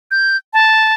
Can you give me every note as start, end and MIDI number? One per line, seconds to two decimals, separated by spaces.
0.11 0.37 91
0.53 0.94 81